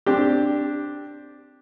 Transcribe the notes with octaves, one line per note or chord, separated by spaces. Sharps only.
C4 D4 G4